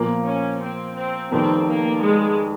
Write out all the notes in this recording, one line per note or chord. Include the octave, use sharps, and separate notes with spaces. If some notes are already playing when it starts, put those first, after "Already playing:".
Already playing: A#2 F3 A#3
C#4
C4
C4
F1 F2 D#3 C4
A#3
G#3